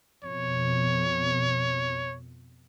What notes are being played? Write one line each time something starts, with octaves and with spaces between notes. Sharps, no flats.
F2 B2 C#5